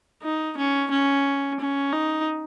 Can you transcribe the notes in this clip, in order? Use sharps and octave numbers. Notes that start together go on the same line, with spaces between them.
D#4
C#4
C#4
C#4
D#4